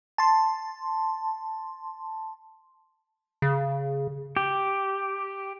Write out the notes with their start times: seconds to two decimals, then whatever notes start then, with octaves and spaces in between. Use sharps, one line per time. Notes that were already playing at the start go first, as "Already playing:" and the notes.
0.18 A5 C6
3.42 C#3
4.37 G4